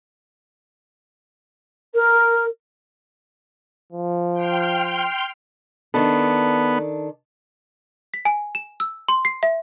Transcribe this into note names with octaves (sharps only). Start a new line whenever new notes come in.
A#4
F3
G5 C6 F6
D#3 B3 D4 A4
B6
G#5
E7
E6
C6
C7
E5